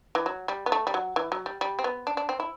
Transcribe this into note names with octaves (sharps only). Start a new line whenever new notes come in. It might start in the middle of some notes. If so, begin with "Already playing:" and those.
E3
F#3
G3
B3
A3
G3
F#3
E3
F#3
G3
G3
C4
B3
D4
D4
C4
E4